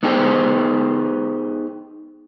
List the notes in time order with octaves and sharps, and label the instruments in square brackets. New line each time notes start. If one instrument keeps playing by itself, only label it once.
[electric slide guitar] B3 D#4 G4 G#4 C5